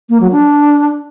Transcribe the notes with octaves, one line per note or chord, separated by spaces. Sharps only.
A#3
F#3
D4